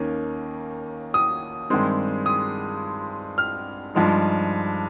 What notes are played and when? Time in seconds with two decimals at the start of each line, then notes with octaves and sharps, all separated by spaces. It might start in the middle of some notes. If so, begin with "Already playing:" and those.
Already playing: D#2 D#3 A#3 C#4
1.14 D#6
1.70 G2 D#3 G#3 C4
2.26 D#6
3.38 F6
3.95 G2 F3 G#3 D#4